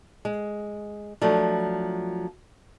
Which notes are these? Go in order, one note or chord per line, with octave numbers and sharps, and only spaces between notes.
G#3
F3 F#3 A3 D4